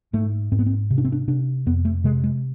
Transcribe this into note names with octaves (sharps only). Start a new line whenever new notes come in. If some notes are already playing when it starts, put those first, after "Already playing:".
G#2 A3
G#2 C4
B3
C4
C3
D4
C4
D4
C3 D4
F2 B3
A3
C3 G#3
G#3